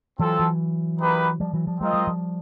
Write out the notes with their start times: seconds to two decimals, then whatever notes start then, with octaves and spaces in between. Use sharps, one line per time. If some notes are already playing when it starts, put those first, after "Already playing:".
0.19 E3 F#3 C4 F4 A4
0.40 E3 F#3
1.00 A#3 D#4 G4 B4
1.40 F3 G3
1.54 E3 F#3
1.67 F3 G3
1.81 F#3 G#3 C4 F4 A#4 D#5
1.93 F#3 G#3
2.07 F3 G3